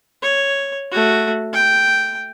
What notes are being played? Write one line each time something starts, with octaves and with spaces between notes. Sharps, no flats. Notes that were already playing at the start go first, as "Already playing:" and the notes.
C#5
A3 F#4
G5